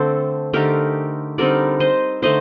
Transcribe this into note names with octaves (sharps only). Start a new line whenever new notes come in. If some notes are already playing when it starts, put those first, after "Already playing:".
Already playing: D3 A3 C4 A4 C5
D3 A3 D#4 G4 A#4
D3 G3 C4 D#4 A#4 D5
C5 D#5
D3 A3 D#4 C5 D#5